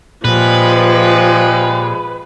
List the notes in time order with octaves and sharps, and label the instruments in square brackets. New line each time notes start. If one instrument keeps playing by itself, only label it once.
[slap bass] A#2 [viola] F3 [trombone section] G3 G#3 [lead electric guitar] B4